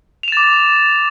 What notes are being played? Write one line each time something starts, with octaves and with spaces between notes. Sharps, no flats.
D6 A6 E7 F7